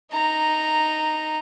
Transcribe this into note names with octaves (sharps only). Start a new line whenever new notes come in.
D#4 A#5